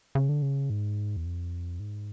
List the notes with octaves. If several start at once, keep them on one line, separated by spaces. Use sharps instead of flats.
C#3
D3
C#3
G#2
E2
F2
G#2